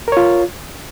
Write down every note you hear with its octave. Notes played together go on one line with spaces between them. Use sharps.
F4 A#4 C#5